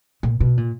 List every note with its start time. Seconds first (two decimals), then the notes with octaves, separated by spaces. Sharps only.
0.23 A#2
0.40 B2
0.57 A#2